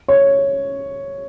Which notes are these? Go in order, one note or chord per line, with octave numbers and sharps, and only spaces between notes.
C#5